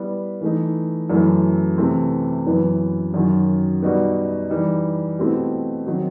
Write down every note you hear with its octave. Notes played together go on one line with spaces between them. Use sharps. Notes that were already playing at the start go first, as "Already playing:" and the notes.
Already playing: G3 B3 E4 B4
E3 A3 D#4
F#2 E3 A3 E4
C3 E3 A3 C4
F#2 E3 B3 E4
F#2 D#3 F#3
B2 G3 D#4 F#4
E3 G3 D#4
B2 A3 C4 E4 G4
D#3 F#3 C4 D#4